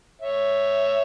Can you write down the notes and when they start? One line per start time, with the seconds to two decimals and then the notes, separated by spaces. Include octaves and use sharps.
0.22 C#5 E5